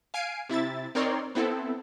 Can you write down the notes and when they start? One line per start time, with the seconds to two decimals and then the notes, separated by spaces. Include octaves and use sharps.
0.14 F5 G#5 C7 D7 D#7
0.49 C3 E4 E5 A6
0.95 C4 D#4 A#4 C#5 D5 C6
1.35 B3 C4 E4 A4